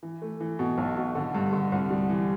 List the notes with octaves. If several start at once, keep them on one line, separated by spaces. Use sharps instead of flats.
E3
A3
E3
B2
B1
B2
D3
G2
D3
C2
G3
E3